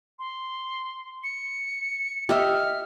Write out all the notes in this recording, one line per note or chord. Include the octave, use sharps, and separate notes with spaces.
C6
C#7
G4 D#5 E5 F6